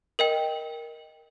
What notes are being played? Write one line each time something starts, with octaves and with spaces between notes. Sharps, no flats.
A#4 D#5 G5